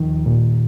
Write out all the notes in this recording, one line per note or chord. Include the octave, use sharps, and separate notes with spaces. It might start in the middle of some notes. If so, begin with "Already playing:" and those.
Already playing: D#2 D#3 F3
A#2